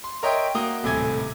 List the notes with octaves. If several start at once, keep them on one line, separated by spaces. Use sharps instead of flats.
C6
A#4 C#5 D#5 E5 G5 C6
A#3 F#4 D#6 G7
D#1 A2 C3 A3 G#5 G#6